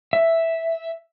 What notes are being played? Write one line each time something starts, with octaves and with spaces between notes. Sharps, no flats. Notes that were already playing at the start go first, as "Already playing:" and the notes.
E5